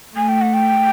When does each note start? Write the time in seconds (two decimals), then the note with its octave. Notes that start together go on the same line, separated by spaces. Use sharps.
0.15 A3 G#5
0.29 G5
0.41 F#5
0.54 G5